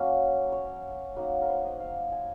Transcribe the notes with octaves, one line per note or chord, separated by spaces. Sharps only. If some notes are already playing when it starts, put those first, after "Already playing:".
Already playing: F#3 A#3 C#4
C#5
F#3 A#3 D#4 F#5
A#4
C5
D#5
F5
G#5